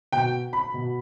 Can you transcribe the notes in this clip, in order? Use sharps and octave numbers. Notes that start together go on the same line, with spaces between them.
B2 G5
B5
B2